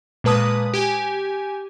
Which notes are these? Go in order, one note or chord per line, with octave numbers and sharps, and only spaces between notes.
A#2 G#3 B4 A5 D#6
G4 G#5